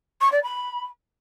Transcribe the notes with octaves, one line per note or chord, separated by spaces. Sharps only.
C#6
D5
B5